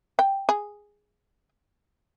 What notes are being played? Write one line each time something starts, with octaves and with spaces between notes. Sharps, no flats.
G5
G#4